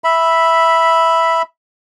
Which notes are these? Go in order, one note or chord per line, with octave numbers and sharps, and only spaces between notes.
E5 B5